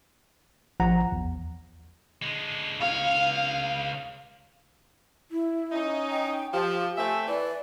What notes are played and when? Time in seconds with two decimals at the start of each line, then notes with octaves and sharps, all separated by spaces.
0.80 A1 F3 F#5 A#5
1.12 E2
2.22 D3 G#3
2.81 C#2 C#5 F5
5.31 E4
5.71 C#4 D#4
6.11 G5
6.53 F3 G4
6.97 A3 C4 E5 G#5
7.28 E3 D5